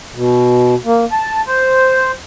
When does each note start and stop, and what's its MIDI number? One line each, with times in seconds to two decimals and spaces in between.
0.15 0.75 47
0.85 1.05 58
1.12 1.41 81
1.47 2.11 72